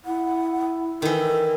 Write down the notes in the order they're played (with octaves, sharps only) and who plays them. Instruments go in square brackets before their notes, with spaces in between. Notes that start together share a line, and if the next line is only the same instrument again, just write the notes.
[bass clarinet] E4 [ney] F#5
[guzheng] D#3 E3 [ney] A4